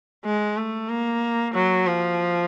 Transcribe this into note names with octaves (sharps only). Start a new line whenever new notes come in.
G#3
A3
A#3
F#3
F3